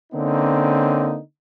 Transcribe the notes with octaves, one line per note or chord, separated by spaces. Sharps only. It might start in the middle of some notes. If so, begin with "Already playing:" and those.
D3 A#3 C4 C#4 D#4